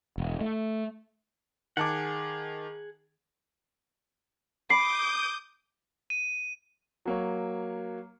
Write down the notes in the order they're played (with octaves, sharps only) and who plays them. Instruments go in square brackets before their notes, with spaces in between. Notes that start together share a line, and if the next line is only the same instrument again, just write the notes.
[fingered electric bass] E1
A3
[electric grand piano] D#3 A5 D6 [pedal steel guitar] G#4 F#5
[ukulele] B5 [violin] D6 [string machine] D#6 G6 [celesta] C7
[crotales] D#7
[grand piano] F#3 A#3 C#5